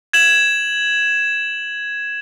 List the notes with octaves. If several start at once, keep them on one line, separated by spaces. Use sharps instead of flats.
G#6 E7 F#7